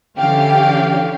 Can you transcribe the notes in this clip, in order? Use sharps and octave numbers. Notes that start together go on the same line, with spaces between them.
D3 E3 C#4 G4 F5